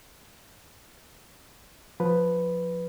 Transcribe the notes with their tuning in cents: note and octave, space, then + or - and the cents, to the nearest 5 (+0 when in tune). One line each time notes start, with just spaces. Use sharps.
F3 +20 B4 +0